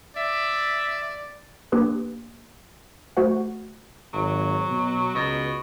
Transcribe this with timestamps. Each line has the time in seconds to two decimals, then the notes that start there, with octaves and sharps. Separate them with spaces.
0.16 D5 E5
1.72 A#3 D4 G4 B4
3.17 A3 F#4 C5 F#5
4.13 G#1 F#3
4.70 B2
5.15 C#2 B2